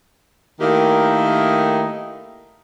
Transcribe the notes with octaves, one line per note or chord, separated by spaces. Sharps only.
D#3 A3 A#3 D#4 E4 G4